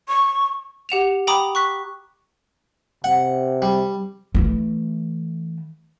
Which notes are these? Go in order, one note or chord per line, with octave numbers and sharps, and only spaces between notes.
C#6
G4 F#5 E7 F7
G5 A#5 B5 D6 D#6
C#6 F#6 B6
C3 F#5
G3
E3 A3